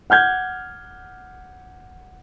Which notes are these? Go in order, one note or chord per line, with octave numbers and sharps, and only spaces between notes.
F#5 F6 G6 G#6